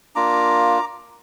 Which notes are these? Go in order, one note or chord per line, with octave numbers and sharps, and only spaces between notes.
A#3 D4 F4 A#5 D6